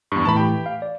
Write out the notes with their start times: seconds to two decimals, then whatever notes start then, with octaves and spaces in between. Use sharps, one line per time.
0.12 E2 G2 C#6
0.25 A2 E3 A3 A5 B5
0.37 G4 G5
0.66 F5
0.82 D5